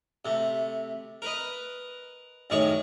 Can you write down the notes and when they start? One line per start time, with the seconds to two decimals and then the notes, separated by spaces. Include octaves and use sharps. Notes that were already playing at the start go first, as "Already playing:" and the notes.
0.25 C3 A3
1.22 A#4 B4 D#5
2.50 F#2 A2 D#3 G#4 C#5 C#6